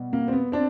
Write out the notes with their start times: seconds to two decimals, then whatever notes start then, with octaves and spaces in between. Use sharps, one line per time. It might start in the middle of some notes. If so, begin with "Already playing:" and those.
Already playing: B2 G3
0.13 A#3
0.28 C4
0.33 B3
0.52 C4 D4